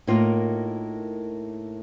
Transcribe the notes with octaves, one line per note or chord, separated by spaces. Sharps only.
A2 A#3 D#4 F4 A#4 F5